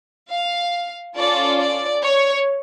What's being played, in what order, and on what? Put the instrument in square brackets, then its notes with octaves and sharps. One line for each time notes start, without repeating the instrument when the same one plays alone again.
[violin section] F5
C#4 F4 A4 D5
D5
C#5